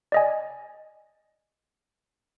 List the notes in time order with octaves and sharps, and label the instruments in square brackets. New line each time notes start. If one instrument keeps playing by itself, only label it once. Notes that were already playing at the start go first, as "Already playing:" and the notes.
[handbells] D5 D#5 G#5